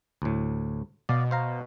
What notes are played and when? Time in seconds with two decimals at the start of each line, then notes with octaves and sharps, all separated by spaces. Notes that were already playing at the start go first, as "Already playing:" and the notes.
0.22 D2 A2
1.09 B2 D5 F5
1.31 C5 F5 A#5